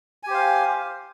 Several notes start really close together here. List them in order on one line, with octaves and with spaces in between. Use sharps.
G#5 G4 C5 F5